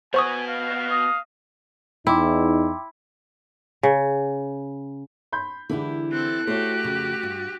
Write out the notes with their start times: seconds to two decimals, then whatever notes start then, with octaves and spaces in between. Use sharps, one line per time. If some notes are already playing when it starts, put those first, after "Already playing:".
0.14 B3 F#4 C5 G#5 C#6 D#6
0.47 F5
0.90 D#5
2.07 E2 D#4 E4 G5 C6 D6
3.83 C#3
5.32 B5 C6 G6
5.69 D3 E3 G#3 D4 E4 G4
6.12 C4 A4 F#6
6.47 A3 F#4 G4 C5 C#5
6.83 F2 C#3
7.23 G2